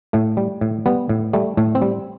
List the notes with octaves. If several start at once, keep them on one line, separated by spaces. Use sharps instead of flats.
A2 A3
G3
A2
G3 B3
A2
G3 A3
A2 A3
C4
G3